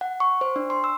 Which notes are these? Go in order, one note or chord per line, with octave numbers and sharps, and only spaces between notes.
F#5
C#6
C5
D4
C6
E6